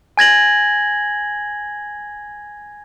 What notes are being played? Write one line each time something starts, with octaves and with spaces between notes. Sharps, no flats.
G#5 G#6 A#6 F#7